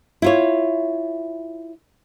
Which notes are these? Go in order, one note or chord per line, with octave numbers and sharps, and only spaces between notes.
E4 F4 C#5